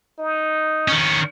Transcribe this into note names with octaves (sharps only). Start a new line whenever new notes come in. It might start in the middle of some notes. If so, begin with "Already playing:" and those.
D#4
D#3 C#4